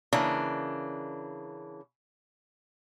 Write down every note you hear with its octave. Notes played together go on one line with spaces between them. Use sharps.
C#3 E3 A#3 D4